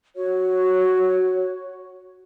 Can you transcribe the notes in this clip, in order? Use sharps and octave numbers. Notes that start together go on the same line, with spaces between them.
F#4 C#5